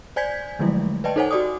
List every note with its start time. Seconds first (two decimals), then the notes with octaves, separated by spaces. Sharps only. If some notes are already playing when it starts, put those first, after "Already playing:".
0.16 C5 D5 G#5 G6 G#6 B6
0.59 D3 F3 F#3 G#3 A3 E4
1.04 B4 D5 D#5 G5 A5
1.16 D#4 A4 C5 C#5 F#5 G#5
1.31 F#4 G4 D5 D6 D#6